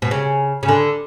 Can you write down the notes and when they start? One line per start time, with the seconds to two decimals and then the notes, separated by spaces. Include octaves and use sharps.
0.02 B2
0.11 C#3
0.63 C#3
0.68 D3